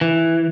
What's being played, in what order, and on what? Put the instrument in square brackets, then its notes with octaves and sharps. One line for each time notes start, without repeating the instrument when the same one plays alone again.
[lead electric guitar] E3